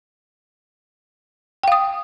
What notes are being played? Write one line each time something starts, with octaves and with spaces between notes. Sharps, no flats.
F5 G5 D#6